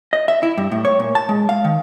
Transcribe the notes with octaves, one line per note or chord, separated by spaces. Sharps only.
D#5
E5
E4
G2
A2
C#5
A#2
A5
G#3
F5
D#3